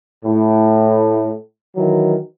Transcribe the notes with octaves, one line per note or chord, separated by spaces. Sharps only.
A2
D#3 E3 F#3